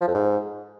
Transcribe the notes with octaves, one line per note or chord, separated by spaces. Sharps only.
F3
F2
G#2